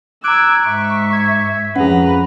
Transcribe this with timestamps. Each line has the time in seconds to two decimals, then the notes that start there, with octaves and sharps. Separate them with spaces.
0.24 A#5 D6 E6 F#6 G#6 D7
0.66 G#2 E5 C#6
1.13 G#6
1.76 F2 C#4 G#4 B4 F#5 A#5